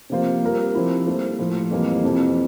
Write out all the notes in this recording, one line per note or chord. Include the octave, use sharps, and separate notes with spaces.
C3 F3 A#3 F4 C5
G3 C4 F4 A#4
F3 C4 E4 G4
G3 A#3 E4 A4 C5
A2 F3 A3
F2 E3 G3 A#3
F2 C3 E3